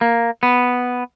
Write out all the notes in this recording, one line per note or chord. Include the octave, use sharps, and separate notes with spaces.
A#3
B3